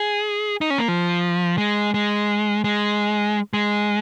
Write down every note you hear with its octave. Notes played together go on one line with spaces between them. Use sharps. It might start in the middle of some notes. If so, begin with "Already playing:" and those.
Already playing: G#4
D#4
C#4
A#3
F3
G#3
G#3
G#3
G#3